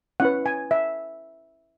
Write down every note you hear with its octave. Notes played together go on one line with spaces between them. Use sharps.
C#4 E4 B4 F#5
G#5
E5